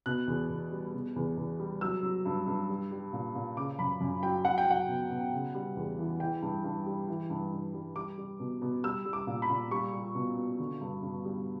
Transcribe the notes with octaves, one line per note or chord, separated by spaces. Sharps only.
B2 F#6
E2
E2
G3
B2
E2
E2
G3
F#3 E6
F#3
G2
G2
G3
G3
A#2
A#2
C#3 D6
F#2 B5
F#2
F#3 G5
F#3 F#5
G5
F#3 F#5
B2
B2
C#3
G3
E2
E3
E3 G5
G2
G2
G3
E3
G2
G2
G3
G3 D6
G3
B2
B2
G3 E6
G3
D6
A#2
B5
A#2
G3 C#6
G3
B2
B2
D3
G2
G2
G3